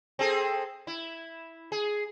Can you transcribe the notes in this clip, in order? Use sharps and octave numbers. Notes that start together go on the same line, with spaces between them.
C4 G#4 A4
E4
G#4